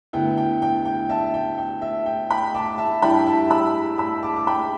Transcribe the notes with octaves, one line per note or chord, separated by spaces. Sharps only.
D2 D3 B3 E4 G5
G5
G5
G5
E5 A5
G5
G5
E5
G5
G5 B5
A5 D6
E5 A5
G2 G3 E4 G5 B5
E5 A5
B5 E6
B5 E6
A5 D6
D6
G5 B5